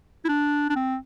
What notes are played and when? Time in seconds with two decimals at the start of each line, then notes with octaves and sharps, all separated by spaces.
0.25 E4
0.29 D4
0.70 D4
0.76 C4